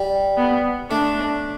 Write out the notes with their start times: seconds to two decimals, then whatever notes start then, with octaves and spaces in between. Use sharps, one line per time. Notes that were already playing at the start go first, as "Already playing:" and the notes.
Already playing: G3
0.37 B3
0.90 A3 D4